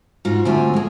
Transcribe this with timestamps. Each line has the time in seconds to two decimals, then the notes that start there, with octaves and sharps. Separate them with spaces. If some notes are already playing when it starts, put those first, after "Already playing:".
0.25 G#2 F4 F#4
0.45 D2 A3 C4 F4 G#5
0.74 G#3 G#4